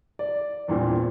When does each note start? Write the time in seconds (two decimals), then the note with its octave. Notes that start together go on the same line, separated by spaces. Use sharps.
0.19 D5
0.68 E2 G2 A#2 C4